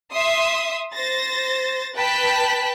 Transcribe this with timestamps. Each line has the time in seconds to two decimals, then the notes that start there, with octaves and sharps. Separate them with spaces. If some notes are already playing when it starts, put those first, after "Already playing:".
0.11 E5 C6 D#6
0.95 C5 A6 A#6
1.96 B4 G5 A5 F#6 B6